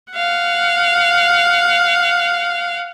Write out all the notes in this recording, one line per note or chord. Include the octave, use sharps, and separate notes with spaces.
F5 F#5